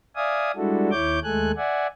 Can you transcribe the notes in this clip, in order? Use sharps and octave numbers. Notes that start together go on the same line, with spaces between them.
D5 E5 F5 G#5 D#6
G3 G#3 D4 E4 F#4 A4
D#2 E4 C#5 D6 G6
D#2 G#3 A3 A4 G#5 F#6
D5 E5 F#5 G#5